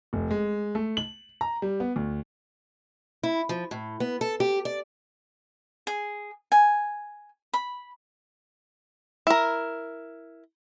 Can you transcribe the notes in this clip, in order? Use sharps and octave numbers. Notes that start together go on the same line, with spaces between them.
F1
G#3
A3
F#7
A#5
G3
B3
D2
E4
F3
A2
B3
A4
G4
D5
G#4
G#5
B5
E4 A#4